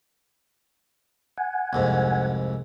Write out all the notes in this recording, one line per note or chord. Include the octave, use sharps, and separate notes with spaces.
F#5 G#5
C2 F2 G#2